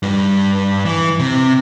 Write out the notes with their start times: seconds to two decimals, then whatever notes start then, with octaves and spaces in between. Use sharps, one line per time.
0.03 G2 G3
0.85 E3
1.20 C3